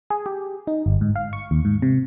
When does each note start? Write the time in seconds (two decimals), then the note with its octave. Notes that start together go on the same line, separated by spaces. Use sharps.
0.10 G#4
0.26 G4
0.67 D#4
0.86 G1
1.01 G#2
1.16 F5
1.33 C#6
1.51 D#2
1.65 G#2
1.82 C3